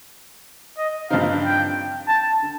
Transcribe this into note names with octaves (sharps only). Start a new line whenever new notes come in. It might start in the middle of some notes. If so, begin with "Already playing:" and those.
D#5
G2 F3 C4 D#4 F5
G5
A5
D3